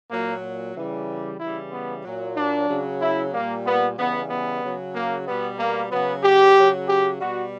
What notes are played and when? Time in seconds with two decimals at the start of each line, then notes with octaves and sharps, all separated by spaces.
0.11 A#2 F#3 A#3
0.75 C#3 E3 G3
1.40 C#3 E3 G3 E4
1.72 B3
2.04 A#2 F#3
2.36 D4
2.69 C#3 F#3
3.01 E4
3.33 A#2 G3 A#3
3.65 B3
3.98 C#3 E3 G3 B3
4.30 B3
4.63 C#3 F#3
4.95 A#3
5.27 B2 G3 B3
5.59 A#3
5.91 C#3 F#3 B3
6.24 G4
6.56 C#3 F#3
6.88 G4
7.20 B2 G3 F#4